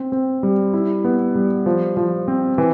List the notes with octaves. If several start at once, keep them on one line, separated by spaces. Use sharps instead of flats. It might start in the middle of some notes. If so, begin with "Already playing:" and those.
Already playing: C4
C4
G3
E4
B3
G3
F3
F3
C4
E3